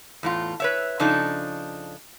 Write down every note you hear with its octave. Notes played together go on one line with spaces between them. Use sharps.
E2 A2 F4
B4 C#5 E5
C#3 F3 D4 D#4 A4